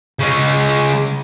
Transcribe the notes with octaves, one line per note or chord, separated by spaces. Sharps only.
C#3 G#3